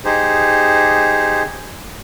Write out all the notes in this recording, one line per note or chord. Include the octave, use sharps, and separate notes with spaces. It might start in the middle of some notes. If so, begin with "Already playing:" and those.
D#4 G4 G#4 C5